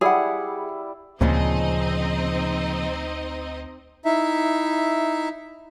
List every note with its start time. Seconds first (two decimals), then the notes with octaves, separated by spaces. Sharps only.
0.01 G3 E4 G#4 D5 F#5
1.21 D2 A#2 C#3 F3 C4 D#4 D#5
4.05 D#4 E4 E5